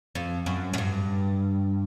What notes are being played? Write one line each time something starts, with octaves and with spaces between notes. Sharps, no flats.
F2
F#2
F#2
G2